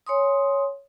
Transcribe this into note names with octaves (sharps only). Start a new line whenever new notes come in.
C#5 G#5 C6 D#6